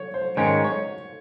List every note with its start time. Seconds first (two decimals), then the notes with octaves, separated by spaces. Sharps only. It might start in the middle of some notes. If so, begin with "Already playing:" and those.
Already playing: C#5
0.14 C5
0.37 G#2 D#3 G#3 C#4 C#5
0.64 C#5